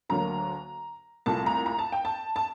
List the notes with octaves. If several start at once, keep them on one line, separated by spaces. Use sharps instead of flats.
D2 D3 F#3 A#3 A#5
C2 A#2 A3 A5
A#5
A#5
A5
G5
A5
A5